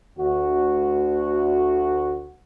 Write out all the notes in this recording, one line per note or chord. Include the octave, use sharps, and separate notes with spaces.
D2 F#4